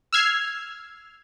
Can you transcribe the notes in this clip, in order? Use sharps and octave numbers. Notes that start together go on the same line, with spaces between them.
E6 F6 G#6 C7